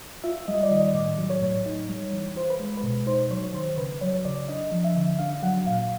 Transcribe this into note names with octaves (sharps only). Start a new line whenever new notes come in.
F4 E5
G3 D#5
D5
D#3 D#5
A2 D5
F#3
C#5
A2
D#4
G3
E3
F4 C5
B4
G#3
B4
B2
D#4 C5
F#3 C#5
D#3 C5
C#3 B4
F#3 C#5
C#3 D5
D4 D#5
F3
E5
D3
D4 F5
F#3 F#5
A#2 F5